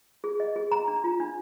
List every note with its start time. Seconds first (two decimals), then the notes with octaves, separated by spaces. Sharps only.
0.24 G#4
0.40 D#5
0.56 G#4
0.72 A#5
0.88 D4
1.04 F4
1.20 D4